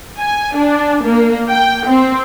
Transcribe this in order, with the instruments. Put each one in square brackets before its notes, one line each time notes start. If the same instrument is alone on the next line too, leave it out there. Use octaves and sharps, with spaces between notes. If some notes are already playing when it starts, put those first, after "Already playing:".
[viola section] G#5
D4
A#3
G5
C4